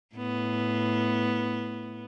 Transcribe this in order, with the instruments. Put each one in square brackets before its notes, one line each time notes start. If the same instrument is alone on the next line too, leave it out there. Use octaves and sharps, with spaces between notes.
[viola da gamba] A2 B3